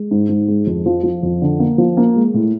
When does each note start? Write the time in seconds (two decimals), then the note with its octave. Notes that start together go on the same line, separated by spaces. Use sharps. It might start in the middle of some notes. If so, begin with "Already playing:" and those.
Already playing: G#3
0.11 G#2
0.29 G#2
0.48 G#3
0.67 F2
0.86 F3
1.04 F3
1.23 F2
1.42 D3
1.60 A#3
1.78 F3
1.97 A#3
2.16 G#3
2.34 A2